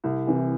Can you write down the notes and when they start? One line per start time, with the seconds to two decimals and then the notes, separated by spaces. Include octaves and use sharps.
0.04 C2
0.27 C3 E3